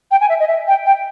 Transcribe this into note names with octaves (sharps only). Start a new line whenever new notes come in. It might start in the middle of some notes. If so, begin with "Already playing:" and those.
G5
G#5
E5
D#5
E5
G5
G5